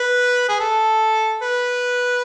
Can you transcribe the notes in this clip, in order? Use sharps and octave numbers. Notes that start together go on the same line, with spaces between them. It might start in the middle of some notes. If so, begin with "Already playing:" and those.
Already playing: B4
G#4
A4
B4